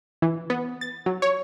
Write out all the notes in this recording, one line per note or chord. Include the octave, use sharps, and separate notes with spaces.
E3
B3
A6
F#3
C#5